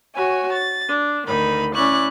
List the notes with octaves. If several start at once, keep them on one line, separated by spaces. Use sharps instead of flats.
F#4 C#5 G#5
A6
D4
D2 D#3 D#4 B5
C#4 E4 D5 C#6 F#6